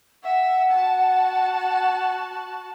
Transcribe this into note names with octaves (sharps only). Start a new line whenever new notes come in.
E5 F#5
F#4 A5